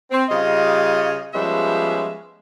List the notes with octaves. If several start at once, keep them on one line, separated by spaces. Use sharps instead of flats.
C4
C#3 G3 F4 D#5
F3 G3 G#3 B3 C#4 E5